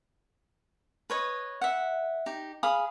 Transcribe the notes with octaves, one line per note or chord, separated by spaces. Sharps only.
B4 C#5 D#5
E5 F#5
D#4 G4
G#4 F5 B5 D#6